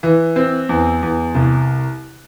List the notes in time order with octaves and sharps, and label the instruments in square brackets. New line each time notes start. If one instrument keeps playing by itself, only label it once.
[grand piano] E3
C4
E2
E2
C2